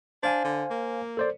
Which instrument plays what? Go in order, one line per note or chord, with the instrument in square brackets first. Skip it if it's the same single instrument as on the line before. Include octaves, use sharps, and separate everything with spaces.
[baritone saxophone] D4 [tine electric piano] C5 F5 G#5
[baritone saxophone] D3
A#3
[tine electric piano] A4 C5 D5